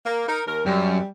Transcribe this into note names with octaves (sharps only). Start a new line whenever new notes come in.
A#3
D#4 A#4
D#2 A#4
F#2 G3